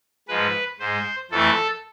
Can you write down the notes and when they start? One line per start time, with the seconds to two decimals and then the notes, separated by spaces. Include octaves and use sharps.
0.28 G#2 F3 G#3 B4
0.80 G#2 G#3 C5
1.31 F2 E3 A3 A4